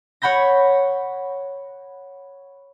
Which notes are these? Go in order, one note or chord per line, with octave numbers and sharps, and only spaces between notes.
C#5 F#5 B5 G6 A#6